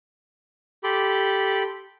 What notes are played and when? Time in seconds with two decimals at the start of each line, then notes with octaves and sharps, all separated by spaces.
0.84 G4 A4 B5 C6 D6